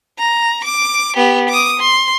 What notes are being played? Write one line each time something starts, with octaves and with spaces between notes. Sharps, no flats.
A#5
D6
B3 G4
D6 D#6
C6